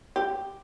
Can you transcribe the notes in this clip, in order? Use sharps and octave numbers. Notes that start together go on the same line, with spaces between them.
G4